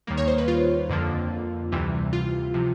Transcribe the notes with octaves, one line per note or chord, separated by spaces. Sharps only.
D#2 D#3 G3 A#3
C#5
C5
B4
F4
F2 D3 F3 A#3
D2 C3 E3 G3
F4
C3 F3